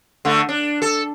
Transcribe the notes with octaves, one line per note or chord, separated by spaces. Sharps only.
D3 A3
D4
A4